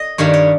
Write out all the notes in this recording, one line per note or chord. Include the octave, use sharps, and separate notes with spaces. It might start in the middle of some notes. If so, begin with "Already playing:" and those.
Already playing: D#5
G2 D#3 G3 A#3 C#5
C#5